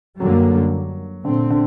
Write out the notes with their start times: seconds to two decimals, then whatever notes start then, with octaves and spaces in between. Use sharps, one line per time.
0.20 F#2 D3 F#3 G3 A#3
1.25 A#2 D3 A3 C4
1.50 D3